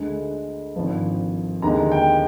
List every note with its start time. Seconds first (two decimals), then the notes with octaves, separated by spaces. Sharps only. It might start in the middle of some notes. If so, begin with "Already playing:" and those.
Already playing: D2 D3 G#3
0.76 G#1 G2 F3
1.62 D#2 D3 G#3 A#5
1.92 G5